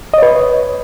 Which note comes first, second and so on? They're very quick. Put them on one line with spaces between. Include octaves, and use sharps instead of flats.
D#5 C#5 B4